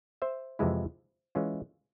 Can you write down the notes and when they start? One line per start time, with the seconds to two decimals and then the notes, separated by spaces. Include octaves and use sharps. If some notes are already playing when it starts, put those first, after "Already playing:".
0.22 C5 E5
0.59 F2 C3 E3 G#3 E4
1.35 E3 G#3 C#4 F4